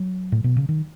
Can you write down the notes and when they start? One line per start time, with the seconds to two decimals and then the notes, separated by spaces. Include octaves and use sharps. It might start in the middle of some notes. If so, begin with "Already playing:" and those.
Already playing: F#3
0.32 A2
0.44 B2
0.57 C#3
0.69 D#3